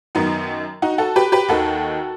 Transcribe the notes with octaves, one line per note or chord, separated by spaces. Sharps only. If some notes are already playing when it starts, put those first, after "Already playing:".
F#2 D#3 B3 D#4
D#4 F#4
F#4 A4
G4 B4
G4 B4
D#2 D#3 F#4 A4